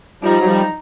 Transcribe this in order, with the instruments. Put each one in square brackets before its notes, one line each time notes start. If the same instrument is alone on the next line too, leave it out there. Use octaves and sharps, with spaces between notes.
[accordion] F3 G3 [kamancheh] D#4
[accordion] F#3
F3 G3